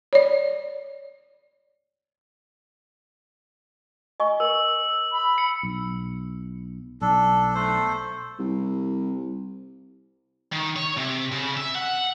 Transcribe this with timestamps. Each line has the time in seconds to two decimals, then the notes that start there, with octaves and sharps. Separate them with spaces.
0.13 C#5 D5
4.20 D#5 G#5 C#6
4.40 A#4 E6
5.12 B5
5.38 C#7
5.63 B1
7.01 B1 D4 A4
7.55 A3 A4 C5
8.39 C2
10.52 D#3
10.76 C#5
10.97 C3
11.32 C#3
11.57 E5
11.75 F#5